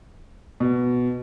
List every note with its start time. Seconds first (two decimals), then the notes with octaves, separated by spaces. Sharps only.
0.60 B2